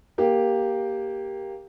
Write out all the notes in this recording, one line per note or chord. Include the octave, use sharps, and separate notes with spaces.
A#3 G4